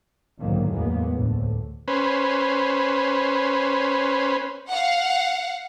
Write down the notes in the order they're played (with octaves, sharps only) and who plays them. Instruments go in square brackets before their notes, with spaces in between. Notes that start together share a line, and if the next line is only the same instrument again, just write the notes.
[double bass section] F#1 B1 G#2 D3 D#3 A#3
E2 A2 G#3 A#3 B3
D2 A2 D3
[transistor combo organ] C#4 B4 C5
[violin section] F5 F#5